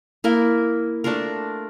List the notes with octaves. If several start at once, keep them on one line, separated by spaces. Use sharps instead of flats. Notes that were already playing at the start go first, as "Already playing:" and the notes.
A#3 E4 A#4
A3 D4 F4 A#4